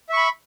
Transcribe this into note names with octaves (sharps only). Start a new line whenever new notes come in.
E5 B5 C#6